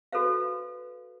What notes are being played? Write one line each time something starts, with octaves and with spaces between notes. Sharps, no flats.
F#4 A4 B4 C5 F5